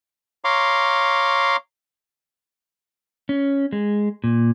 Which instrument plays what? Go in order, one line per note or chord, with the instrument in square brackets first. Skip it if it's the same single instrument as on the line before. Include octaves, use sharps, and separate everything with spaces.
[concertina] C#5 F5 A#5 C6 D6
[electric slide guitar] C#4
G#3
A#2